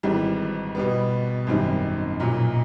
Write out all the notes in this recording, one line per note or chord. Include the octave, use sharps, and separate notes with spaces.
G#1 G#2 E3 G3
B2 G3 B3
G#1 F#2 D#3 G3 C4
B1 A#2 F#3